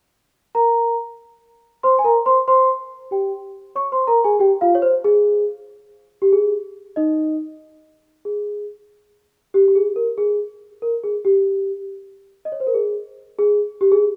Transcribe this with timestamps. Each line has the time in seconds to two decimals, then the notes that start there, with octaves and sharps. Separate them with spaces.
0.55 A#4 A#5
1.83 C5 C6
1.99 G#5
2.04 A#4 A#5
2.26 C5 C6
2.48 C5 C6
3.11 G4 G5
3.75 C#5 C#6
3.92 C5 C6
4.07 A#4 A#5
4.24 G#4 G#5
4.39 G4 G5
4.61 F4 F5
4.75 C#5
4.82 C5
5.04 G#4
6.22 G4
6.32 G#4
6.96 D#4 D#5
8.25 G#4
9.54 G4
9.68 G4
9.76 G#4
9.96 A#4
10.18 G#4
10.82 A#4
11.03 G#4
11.25 G4
12.45 D#5
12.52 C#5
12.60 C5
12.67 A#4
12.74 G#4
13.39 G#4
13.81 G4
13.92 G#4